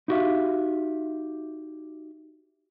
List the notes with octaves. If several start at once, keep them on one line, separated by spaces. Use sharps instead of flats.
D#4 E4 F#4 G4 E5 F5